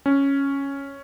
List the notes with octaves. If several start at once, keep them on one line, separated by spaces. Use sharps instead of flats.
C#4